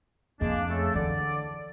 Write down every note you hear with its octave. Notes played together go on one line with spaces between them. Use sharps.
F2 G#3 A#3 D4
C#3 A3 A4
D3 E3 D5